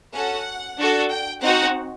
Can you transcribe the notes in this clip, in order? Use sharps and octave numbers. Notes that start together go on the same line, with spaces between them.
C#4 F#4 A4 F#5
D4 F#4 A4
G5
C4 D#4 F#4 F#5